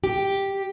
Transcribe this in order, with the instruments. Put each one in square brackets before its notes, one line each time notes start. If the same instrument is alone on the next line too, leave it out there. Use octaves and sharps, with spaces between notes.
[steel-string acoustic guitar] G4